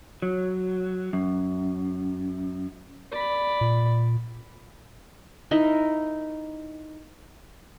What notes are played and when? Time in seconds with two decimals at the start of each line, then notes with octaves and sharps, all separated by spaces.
0.22 F#3
1.13 F#2
3.11 D5 B5
3.61 A#2
5.51 D#4 E4 A#4 D#5